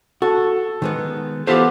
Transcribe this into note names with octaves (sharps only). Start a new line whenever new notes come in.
F#4 A4 A5
D#3 G#3 B3
E3 B3 F4 G4 A4 C5